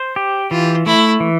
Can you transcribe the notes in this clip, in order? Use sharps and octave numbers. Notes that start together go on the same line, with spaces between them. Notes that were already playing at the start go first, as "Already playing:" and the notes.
Already playing: C5
G4
E3 F4
A3 E4
E3